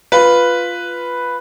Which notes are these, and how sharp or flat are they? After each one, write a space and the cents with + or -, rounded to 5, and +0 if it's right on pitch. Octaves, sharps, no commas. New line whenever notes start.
F4 +0 B4 +0